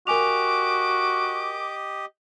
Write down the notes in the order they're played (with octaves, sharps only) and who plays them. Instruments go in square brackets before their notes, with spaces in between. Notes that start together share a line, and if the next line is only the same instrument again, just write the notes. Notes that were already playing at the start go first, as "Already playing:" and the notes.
[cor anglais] F#4 [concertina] G4 D#5 [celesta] A#4 G#5 F7 [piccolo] D6